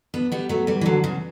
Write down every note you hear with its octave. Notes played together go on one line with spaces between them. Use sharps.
B3 D4
G3 B3
F#3 A3
E3 G3
E3
D3 F#3
C#3 E3